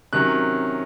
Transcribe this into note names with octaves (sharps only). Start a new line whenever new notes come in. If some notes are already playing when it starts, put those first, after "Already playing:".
C3 D#3 F#3 C#4 F#6